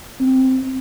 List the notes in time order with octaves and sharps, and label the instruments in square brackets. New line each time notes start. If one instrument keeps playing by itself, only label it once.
[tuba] C4